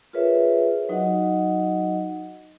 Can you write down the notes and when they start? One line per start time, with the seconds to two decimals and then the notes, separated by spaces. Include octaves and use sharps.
0.13 F4 G#4 A#4 B4 C#5 E5
0.89 F#3 D#4 F#4 D#5 F#5